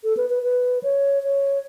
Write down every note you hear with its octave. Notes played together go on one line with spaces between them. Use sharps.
A4
B4
B4
B4
C#5
C#5